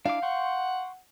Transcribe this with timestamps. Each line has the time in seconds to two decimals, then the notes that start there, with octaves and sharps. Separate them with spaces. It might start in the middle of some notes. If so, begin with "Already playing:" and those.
0.05 D4 E4 F5 D6
0.22 F#5 G5 C6 C#6